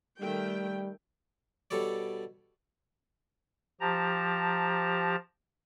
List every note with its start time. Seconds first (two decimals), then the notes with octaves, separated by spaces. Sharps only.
0.20 D#3 G3 A3 G5
1.70 B2 G3 A4 C#5 D5
3.81 F3 G4 A5 A#5